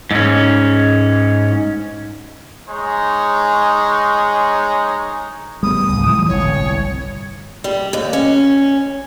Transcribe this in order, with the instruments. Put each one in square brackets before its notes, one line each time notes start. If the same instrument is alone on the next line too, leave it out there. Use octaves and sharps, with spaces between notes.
[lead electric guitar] G#2 C#4
[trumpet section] G#3 D#4 C#5
[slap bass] G3 B3 [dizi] D#6
[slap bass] C#2 A2
E3 F3 G#3
[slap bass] G1 C2 A2 [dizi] C#5
[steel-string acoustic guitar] G3
D#2
C#4